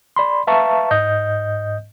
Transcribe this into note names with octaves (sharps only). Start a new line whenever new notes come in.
D5 B5 C6
B4 E5 F5 A5 A#5 C#6
G#2 D#5 G6